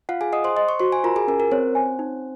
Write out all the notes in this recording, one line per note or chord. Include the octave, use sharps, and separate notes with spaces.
F4 F5 F#5
G#4 G#5
D#5 F#5 D#6
C5 C6
D#5 C6
C#6
F#4 C5 C6
G#5
F4 A#4 A#5
G#4 G#5
C#4 A#4
A#4
C4 C5 C#5
G#5
D#4